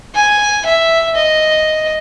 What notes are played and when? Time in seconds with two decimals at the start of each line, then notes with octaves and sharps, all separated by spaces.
0.15 G#5
0.66 E5
1.15 D#5